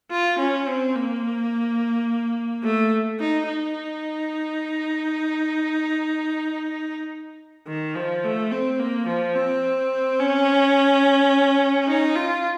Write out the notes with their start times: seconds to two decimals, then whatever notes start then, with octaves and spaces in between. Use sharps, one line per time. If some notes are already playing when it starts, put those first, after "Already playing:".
0.11 F4
0.39 C#4
0.68 C4
0.95 A#3
2.63 A3
3.20 D#4
3.48 D#4
7.67 D#3
7.95 F3
8.24 A3
8.51 C4
8.79 A#3
9.07 F3
9.36 C4
10.20 C#4
11.88 D#4
12.16 F4